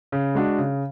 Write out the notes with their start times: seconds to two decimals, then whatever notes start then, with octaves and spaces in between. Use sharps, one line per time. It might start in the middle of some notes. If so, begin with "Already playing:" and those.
0.12 C#3
0.35 G#3 D4 F#4
0.58 C#3